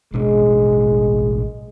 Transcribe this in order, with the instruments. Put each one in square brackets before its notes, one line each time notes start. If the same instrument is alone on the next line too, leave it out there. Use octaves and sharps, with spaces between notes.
[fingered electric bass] A1 B2 D4 [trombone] G#3